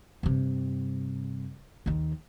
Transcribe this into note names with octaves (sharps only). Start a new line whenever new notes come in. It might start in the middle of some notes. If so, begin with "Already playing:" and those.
G2 C3
D#2 D#3